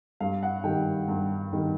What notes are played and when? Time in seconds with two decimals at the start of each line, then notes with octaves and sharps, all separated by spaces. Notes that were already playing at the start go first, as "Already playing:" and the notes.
0.20 G2 F5
0.43 F#5
0.64 D#3 G3 G5
1.08 G2
1.53 D#3 G3